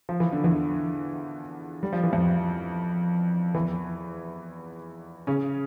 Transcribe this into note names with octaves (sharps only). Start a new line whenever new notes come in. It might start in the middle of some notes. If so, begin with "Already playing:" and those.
F3
E3
D3
E2 E3
G3
F3
E3
F2 F3
E2 E3
C#3 C#4